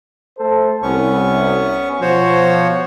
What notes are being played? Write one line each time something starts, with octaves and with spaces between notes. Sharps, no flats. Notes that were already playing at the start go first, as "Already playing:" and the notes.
A3 A4 C5
C2 B3 C#4 C#6
B2 F3 F#4 C5 C#5